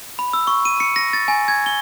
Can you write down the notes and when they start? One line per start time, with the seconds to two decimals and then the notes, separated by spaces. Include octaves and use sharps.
0.19 B5
0.33 E6
0.47 C#6
0.65 D#7
0.80 C#7
0.96 A#6
1.13 A6
1.28 G#5
1.48 G#6
1.66 G7